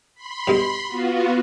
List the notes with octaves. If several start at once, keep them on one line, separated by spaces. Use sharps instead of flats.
B5 C6
G2 B2 G#3
B3 F4 F#4